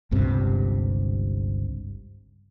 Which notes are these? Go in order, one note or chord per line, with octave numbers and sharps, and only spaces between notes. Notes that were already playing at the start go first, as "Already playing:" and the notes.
G1 C#2 G2 C3